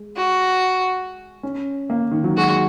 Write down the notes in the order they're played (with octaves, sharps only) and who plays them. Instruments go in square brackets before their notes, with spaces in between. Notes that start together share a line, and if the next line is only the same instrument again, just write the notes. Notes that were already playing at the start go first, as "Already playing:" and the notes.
Already playing: [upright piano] G#3
[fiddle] F#4
[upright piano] C#4
A#3
D#3
F#3
[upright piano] G#3 [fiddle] F#4